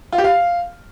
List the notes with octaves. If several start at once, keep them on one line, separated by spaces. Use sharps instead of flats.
F4
G4
F5